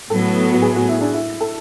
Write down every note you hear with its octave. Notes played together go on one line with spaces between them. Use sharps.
A2 F#3 B3 A4
F#4
G#4
F#4
E4
D4
E4
A4